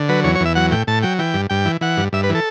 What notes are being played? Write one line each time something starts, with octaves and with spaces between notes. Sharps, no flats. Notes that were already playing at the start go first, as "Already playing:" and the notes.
Already playing: D3
F#3 B4
E2 C#5
C#5
E2
E5
F#3 F#5
A2 G5
A2 A5
F#3 G5
E3 G5
G2
G2 G5
E3
E3 F#5
G2
G2 E5
B4
E3
A4